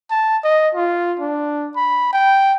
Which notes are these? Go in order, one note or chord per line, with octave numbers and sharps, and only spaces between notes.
A5
D#5
F4
D4
B5
G5